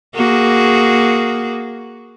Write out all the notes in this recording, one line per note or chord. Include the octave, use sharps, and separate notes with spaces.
A#3 F#4 G#4